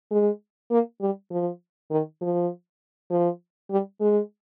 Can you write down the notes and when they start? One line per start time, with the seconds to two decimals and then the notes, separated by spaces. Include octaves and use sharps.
0.11 G#3
0.71 A#3
1.01 G3
1.31 F3
1.91 D#3
2.21 F3
3.11 F3
3.70 G3
4.01 G#3